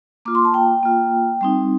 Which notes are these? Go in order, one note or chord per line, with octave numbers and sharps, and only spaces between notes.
A#3 F4 D6
C6
A5
G5
A#3 F4
G3 C4 D#4